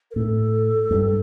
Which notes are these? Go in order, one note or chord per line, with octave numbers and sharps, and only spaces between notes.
A#4
A2 A4
G2